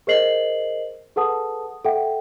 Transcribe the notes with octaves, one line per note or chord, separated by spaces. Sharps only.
G#4 A#4 C5 D#5 C7 F#7
G#4 A4 B4 F#5 A5 D#6
A4 E5 F#5 G5